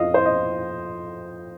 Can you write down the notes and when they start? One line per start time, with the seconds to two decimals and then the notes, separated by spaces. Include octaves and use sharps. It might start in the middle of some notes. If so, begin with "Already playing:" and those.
Already playing: F2 F3 D#5 F5
0.14 C5
0.26 D#5